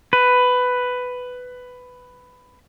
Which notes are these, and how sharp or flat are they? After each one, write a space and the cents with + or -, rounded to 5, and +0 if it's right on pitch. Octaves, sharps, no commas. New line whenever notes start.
B4 +10